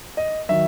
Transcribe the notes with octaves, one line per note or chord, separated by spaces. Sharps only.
D#5
D#3 F#3 E5